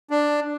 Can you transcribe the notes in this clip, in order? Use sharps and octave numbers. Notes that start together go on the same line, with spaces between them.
D4